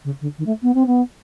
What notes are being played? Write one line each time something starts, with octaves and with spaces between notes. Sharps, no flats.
C#3
D3
D#3
A3
B3
C4
B3